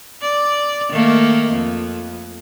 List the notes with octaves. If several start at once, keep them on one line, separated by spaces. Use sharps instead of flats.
D5
D#3 A3 A#3
F2